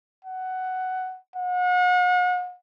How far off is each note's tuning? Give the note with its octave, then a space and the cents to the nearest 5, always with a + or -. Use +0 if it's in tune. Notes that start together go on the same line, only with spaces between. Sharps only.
F#5 +10
F#5 -40